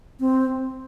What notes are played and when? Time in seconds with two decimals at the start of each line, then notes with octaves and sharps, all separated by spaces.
0.20 C4